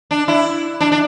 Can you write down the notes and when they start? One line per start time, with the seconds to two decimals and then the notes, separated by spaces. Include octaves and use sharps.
0.11 D4
0.28 E4
0.80 D4
0.92 D4